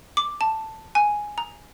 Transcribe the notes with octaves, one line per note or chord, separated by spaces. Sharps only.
D6
A5
G#5
A#5